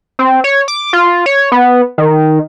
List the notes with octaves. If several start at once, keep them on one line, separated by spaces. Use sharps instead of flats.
C4
C#5
D6
F4
C#5
B3
D#3